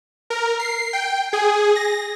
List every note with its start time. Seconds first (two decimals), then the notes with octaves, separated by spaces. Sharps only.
0.30 A#4
0.59 C7
0.93 G5
1.33 G#4
1.75 A#6